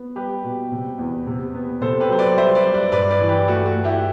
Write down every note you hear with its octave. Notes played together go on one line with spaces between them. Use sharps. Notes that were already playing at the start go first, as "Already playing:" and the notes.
Already playing: B3
G3 G4 B4
B2
C3
E2
C3
B3
C3 A4 C5
G4 B4
F#3 C5
B4 D5
G3 C5 E5
B4 D5
G3
B4 D5
G2 B4 D5
B4 D5
E3
G4 B4
A3 F#4
F#4
A3
E4 G4